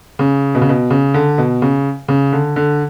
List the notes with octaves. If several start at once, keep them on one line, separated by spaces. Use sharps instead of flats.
C#3
B2
C#3
B2
C#3
D3
B2
C#3
C#3
D3
D3